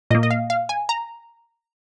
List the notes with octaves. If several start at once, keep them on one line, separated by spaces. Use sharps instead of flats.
A#2 A#3 D#5
D#5
F5
F5
G#5
A#5